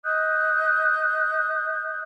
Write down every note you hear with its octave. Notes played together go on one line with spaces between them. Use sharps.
D#5 D#6 F#6 G6